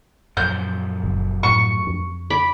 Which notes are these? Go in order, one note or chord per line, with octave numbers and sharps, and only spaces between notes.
F#2 A#2 F3 G6
F#1
A2 C#6
F2
B5 D6